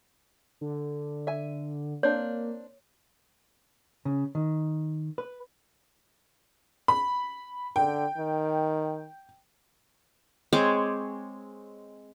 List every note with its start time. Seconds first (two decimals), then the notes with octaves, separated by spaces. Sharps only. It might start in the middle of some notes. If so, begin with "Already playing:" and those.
0.61 D3
1.27 E5 G#5
2.03 A#3 C4 D4 C#5
4.05 C#3
4.35 D#3
5.18 B4
6.88 B5
7.76 D3 G5
8.18 D#3
10.53 G#3 C4 C#5 D6